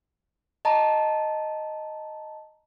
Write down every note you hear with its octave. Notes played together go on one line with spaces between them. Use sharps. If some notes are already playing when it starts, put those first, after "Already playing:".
D#5 A5 A#5